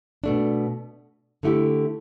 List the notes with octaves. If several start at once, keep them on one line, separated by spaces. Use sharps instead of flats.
B2 A3 D4
D3 A3 E4 G4